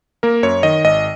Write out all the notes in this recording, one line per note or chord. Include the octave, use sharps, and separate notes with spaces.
A#3 A#4
F#2 C#5
D#3 D#5
G#1 D#5